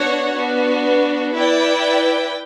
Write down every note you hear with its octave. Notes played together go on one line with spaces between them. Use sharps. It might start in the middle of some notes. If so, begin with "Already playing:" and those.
Already playing: B3 D4 F#4 C#5 F#5
B3 D4 F#4
E4 B4 D5 G5